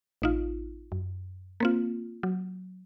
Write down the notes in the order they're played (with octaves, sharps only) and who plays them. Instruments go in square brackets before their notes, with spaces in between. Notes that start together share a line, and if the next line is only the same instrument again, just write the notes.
[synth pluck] A1 D#4 F4
F#2
A#3 C4 F4
F#3